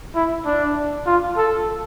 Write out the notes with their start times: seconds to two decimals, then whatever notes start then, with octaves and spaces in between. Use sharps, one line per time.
0.15 E4
0.46 D4
1.06 F4
1.37 A4